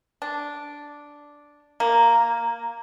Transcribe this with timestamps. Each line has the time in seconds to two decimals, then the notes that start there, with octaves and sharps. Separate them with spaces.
0.22 D4
1.80 A#3